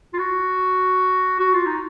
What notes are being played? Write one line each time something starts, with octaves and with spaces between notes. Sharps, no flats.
F4
F#4
F#4
F4
D#4